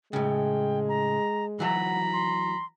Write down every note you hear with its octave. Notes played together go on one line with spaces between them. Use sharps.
A2 C#3 G#3 G5
A#5
E3 F#3 F#5 A#5 B5
C6